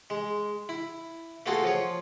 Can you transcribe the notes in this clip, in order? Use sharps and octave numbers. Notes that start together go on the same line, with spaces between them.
G#3
E4
A3 A#3 F4 F#4 G#4 A4
F3 C#5